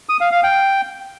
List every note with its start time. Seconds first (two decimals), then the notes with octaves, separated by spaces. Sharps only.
0.09 D#6
0.21 F5
0.32 F5
0.43 G5